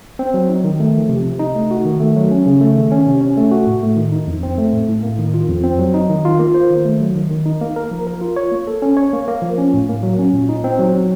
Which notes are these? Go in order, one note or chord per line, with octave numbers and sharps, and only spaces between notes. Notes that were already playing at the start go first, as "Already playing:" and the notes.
C4
F#3
D#4
D#3
A3
F3
C3
C3
D#4
A3
F#4
D#3
A3
F#3
C#4
C#3
A3
D#3
C#4
C3
C#4
A3
F#4
A2
A3
D#3
D#4
F2
C4
A3
A2
A2
A#3
D#3
F4
F2
C4
F#3
D#4
D#3
F4
A#3
C5
D#3
A3
F#3
D#3
D#3
D#4
A#3
A#4
F3
A#4
F4
C#5
A#3
A4
C#4
C#5
A#3
A#3
F3
C#4
A2
A#3
F#3
C#4
A#2
D#4
C4
F#3
F#3